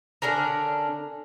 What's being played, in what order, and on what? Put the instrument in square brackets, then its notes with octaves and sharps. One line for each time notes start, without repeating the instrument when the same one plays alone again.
[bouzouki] D3 C#4 D4 A#4